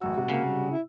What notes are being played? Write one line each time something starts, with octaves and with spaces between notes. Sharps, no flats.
A1 F#2 F#4 E6
G#2 C3
C#3 A#3
G3
E4